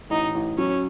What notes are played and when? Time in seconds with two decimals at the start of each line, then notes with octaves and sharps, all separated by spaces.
0.10 A1 D#4
0.34 A1
0.58 F#3 C#4